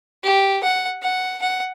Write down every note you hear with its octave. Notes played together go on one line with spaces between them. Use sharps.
G4
F#5
F#5
F#5